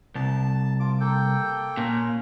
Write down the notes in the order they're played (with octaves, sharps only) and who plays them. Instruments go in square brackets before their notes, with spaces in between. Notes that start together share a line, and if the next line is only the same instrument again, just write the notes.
[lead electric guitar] C2 [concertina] A5
[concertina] F4 D6
A#3 A4 G5
[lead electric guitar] A#2 [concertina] C#4